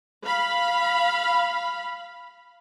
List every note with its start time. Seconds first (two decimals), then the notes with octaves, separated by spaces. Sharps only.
0.25 F5 B5